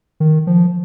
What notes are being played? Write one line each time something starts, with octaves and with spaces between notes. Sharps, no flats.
D#3
F3